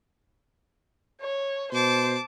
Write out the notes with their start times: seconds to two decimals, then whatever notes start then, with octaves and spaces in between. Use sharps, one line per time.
1.21 C#5
1.72 B2 C5 A5 D6